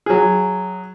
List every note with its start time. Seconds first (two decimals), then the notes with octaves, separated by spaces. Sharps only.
0.06 F#3 G#4